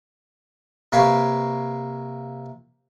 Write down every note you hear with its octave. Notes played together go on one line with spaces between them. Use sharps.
C3 A#3 B4 C#5 F5